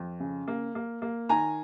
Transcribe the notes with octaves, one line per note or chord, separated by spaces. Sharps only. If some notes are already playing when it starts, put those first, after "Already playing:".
Already playing: F2
C#3
A#3
A#3
A#3
D#3 G#5 A#5